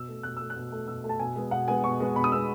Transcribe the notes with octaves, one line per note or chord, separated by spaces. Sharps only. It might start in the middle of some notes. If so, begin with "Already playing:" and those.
Already playing: B2 E6
A3
B2 F#6
A3 E6
F#6
B2
A3
B2 E6
A3
A5
B2 G#5
G#3 B3
B2 F#5
G#3 B3 G#5
B2 C#6
G#3 B3
B2 B5
D#6
G#3 B3 E6